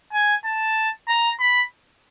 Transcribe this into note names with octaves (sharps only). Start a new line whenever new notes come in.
G#5
A5
A#5
B5